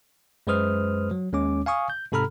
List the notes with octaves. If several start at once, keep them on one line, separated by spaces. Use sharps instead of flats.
F#2 G#3 B4 C5 D#6 F6
F#3
D#2 G#3 C#4 D6
F5 G#5 C#6 D#6
G6
G#2 C3 A4 A#5 B5 F6